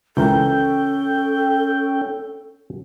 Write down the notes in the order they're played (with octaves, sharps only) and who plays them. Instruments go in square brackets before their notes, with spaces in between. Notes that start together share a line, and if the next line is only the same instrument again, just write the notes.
[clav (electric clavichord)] C#2 E3 A#4 [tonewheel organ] C#4 G5 [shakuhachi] A4